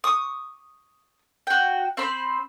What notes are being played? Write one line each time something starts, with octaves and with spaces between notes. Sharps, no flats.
C#6 D#6
F#4 G5
C4 C5 B5